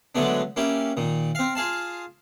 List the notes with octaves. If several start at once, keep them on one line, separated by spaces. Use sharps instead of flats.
D3 F#3 G#3 A3 B3 D4
A#3 C#4 E4 G4
A#2 D#3
C4 F5
F4 G#4 F5 A5